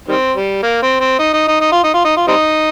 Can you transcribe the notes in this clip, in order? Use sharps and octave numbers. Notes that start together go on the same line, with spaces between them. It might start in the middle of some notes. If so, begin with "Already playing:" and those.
D#3 G3 C4
G3
A#3
C4
C4
D#4
D#4
D#4
D#4
F4
D#4
F4
D#4
F4
G3 C4 D#4